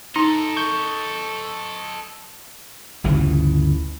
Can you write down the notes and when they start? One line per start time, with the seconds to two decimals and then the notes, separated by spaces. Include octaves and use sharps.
0.16 D#4 A4 D#5 A#5
0.57 C#6 G6
3.04 G1 D2 C#3 E3